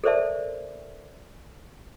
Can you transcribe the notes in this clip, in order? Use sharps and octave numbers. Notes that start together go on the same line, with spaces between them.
A4 A#4 C5 D5 E5 A5